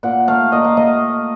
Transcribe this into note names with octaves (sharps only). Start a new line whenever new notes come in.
A#2 F#5
A3 F5
A#2 D#5
F5
A3 D#5